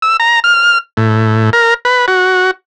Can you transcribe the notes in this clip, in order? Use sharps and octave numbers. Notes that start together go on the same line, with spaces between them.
E6
A#5
F6
A2
A#4
B4
F#4